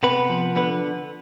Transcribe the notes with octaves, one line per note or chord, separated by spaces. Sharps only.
C3 B3 B4
F3
D3 B3 B4